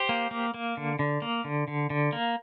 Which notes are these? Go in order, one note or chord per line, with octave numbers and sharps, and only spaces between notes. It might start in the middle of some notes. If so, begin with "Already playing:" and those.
Already playing: G4 C5
A#3
A#3
A#3
D3
D3
A#3
D3
D3
D3
A#3